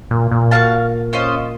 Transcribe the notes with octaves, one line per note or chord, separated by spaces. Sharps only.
A#2
A#2
F#4 A#4 F5 A5
C#4 F4 C5 D#5